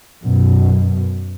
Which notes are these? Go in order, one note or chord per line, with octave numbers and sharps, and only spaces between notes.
F#2 B2